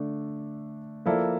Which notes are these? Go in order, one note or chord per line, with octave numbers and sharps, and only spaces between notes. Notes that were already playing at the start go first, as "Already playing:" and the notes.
Already playing: D3 A3 D4
F3 A#3 E4 A4 D5